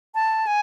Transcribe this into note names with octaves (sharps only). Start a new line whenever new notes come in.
A5
G#5